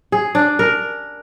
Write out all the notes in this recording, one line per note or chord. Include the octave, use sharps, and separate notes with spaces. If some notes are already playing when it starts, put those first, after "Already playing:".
G#4
D4
A#4